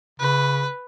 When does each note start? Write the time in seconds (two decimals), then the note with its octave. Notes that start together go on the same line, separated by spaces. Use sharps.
0.20 C#3 B4